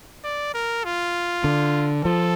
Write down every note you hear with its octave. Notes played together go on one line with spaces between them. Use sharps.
D5
A#4
F4
D3
F3 A4